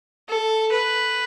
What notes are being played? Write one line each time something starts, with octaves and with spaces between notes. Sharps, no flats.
A4
B4